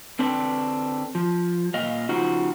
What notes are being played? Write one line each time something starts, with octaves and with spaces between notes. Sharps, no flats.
D3 C4 D4 B4
F3
A#2 D#5 F5
C#3 F3 D#4 F4 F#4